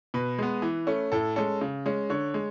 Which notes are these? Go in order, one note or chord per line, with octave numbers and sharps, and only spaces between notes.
B2 B4
G#3 B3
E3
A3 C#4
A2 A4
G#3 C#4 A4
C#3
G#3 C#4
D3 C#5
G#3